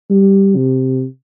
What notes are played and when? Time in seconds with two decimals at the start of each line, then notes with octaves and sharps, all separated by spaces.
0.10 G3
0.56 C3